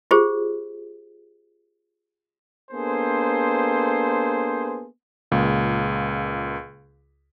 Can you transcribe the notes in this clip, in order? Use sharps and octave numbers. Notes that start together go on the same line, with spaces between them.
F4 G4 G#4 C5
A#3 B3 D4 G#4 A4 C5
C#2 A#2